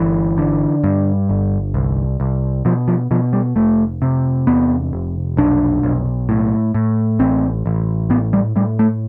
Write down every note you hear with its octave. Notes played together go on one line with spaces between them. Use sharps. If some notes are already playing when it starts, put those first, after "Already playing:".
Already playing: G1 E3
D3
G2
G1
C2
C2
B2 F3
F3
B2 F3
G3
F1 A3
C3
E2 B3
F1
B1 D4
B1
A2
A2
A1 C4
A1
A2 B3
G3
A2 G3
A3